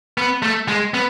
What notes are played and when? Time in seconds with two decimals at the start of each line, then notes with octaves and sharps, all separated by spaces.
0.18 B3
0.42 A3
0.68 G#3
0.94 B3